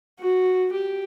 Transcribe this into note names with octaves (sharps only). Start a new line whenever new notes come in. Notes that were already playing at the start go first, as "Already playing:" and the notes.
F#4
G4